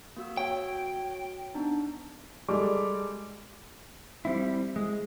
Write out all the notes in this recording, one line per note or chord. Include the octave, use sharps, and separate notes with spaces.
A#3 F#4 E6
F#4 C#5 G5
B3 D4 D#4
G3 G#3 A4 D6
G3 C4 E4
G#3